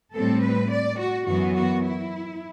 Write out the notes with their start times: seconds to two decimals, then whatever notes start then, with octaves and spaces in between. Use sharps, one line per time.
0.13 A2 G3 C4 A4
0.42 B4
0.71 D5
0.98 F#4
1.26 F#2 E3 B3 F#4
1.55 F#4
1.84 E4